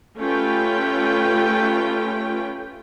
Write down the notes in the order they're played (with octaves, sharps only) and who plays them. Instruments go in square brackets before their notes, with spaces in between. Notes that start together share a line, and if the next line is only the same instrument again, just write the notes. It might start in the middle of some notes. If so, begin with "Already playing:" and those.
[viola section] A3 C#4 F4 G4 B4 G5